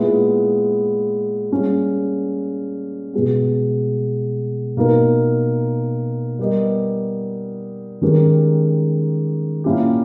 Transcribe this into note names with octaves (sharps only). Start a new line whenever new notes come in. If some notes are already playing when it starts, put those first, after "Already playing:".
Already playing: A#2 G#3 B3 E4
G3 A#3 C#4 G#4
B2 G#3 B3
B2 A#3 D#4 A#4
G3 B3 G4 A#4 D#5
D#3 G#3 C#4 G4 A#4
A#2 A#3 C#4 E4 G4